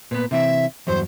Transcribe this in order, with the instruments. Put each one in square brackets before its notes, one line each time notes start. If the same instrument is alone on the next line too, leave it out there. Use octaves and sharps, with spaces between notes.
[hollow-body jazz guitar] A#2 B3 [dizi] B4
[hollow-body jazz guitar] C3 E3 C4 [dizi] E5
[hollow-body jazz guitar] E2 G2 F#3 [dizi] C5